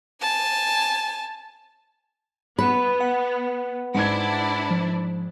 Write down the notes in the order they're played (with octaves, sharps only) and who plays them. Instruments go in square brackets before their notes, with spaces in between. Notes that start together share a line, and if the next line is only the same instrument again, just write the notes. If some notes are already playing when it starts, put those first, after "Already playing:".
[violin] G#5 A5
[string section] B3 [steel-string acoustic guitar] B4
[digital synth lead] F#5
[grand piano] G#2 G#6 [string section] D4 E4 [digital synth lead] F#5
[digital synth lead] F3